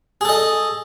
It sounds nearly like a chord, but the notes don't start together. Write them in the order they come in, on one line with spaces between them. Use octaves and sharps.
G#4 A4 D#5